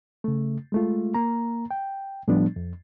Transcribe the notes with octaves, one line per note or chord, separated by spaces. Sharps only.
C#3 A3
G#3 A3 F4
A#3 A#5
G5
A2 F3 G3 B3 D4
F2